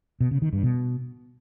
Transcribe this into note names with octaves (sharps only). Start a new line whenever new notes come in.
B2
C#3
D#3
G2
B2